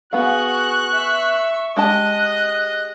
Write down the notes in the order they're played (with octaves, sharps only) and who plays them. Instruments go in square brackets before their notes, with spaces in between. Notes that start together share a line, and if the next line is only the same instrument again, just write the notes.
[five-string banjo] B3 F5 [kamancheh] F#4 G#4 [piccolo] C#6 [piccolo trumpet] F#6
[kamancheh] E5
[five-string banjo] G#3 G4 A5 [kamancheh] D#5 [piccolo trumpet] D#6 [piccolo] F#6